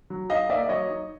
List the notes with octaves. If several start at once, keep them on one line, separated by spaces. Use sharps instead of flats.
F#3
D#4 D#5 F5
A#3 D5 E5
F#3 C#5 D#5
D#4